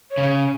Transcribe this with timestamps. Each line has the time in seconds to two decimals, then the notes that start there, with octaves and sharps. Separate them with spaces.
0.11 C#5
0.17 C#3